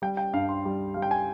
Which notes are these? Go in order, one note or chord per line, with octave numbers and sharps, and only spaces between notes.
G3 G5
G5
G2 F5
C6
G3
G3 F5
G5
G#5